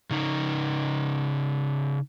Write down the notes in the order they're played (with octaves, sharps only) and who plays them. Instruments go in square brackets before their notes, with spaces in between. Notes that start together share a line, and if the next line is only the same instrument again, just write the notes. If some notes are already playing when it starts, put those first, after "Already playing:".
[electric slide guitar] C#3 D#4